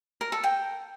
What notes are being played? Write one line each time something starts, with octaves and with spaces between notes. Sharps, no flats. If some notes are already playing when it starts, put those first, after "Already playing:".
A#4
A4
G5